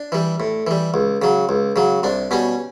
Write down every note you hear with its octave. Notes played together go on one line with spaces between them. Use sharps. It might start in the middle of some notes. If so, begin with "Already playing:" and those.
Already playing: D4
E3 G3
A2
E3 G3
C#2
C#3 F#3
C#2
C#3 F#3
C2 D4
B2 G3 C#4